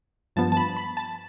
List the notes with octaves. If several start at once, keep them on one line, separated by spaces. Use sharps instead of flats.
G2 F3 B3 A5
A5
B5
B5
A5